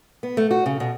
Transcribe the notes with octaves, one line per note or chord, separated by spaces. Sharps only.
B3
A3
F#4
C#3
B2